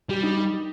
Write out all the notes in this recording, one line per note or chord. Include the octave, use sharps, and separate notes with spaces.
G3 G4
D#4